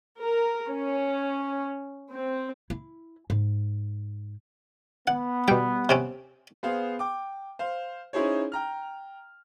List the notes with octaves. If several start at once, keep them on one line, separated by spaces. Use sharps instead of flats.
A#4
C#4
C4
E4
G#2
B3 F#5
B2 G3 G5
C3 C4 C#4
B3 G#4 C5 F5
G5 D6
C5 F5
C#4 D#4 E4 G#4 C5 C#5
G5 A#5 F6